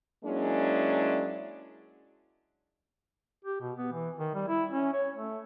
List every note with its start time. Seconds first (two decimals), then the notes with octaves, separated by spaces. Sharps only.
0.24 F#3 G#3 A#3 C#4 D4 E4
3.45 G4
3.61 B2
3.78 B3
3.92 E3
4.19 D#3
4.35 G3
4.48 E4
4.71 C#4
4.94 C#5
5.15 A3